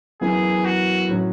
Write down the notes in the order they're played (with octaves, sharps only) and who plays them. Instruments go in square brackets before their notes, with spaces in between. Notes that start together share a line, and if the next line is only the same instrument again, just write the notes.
[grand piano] F#2 E3 B3 E4 [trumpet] G#4
[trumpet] F#4
[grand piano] A2 F#3 C#4